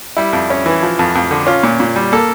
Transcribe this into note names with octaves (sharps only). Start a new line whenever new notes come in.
G3 E4
F2
C#4
E3
F3
F2
F2
D3
C#4 F4
A#2
A#2
G3
A#3 A4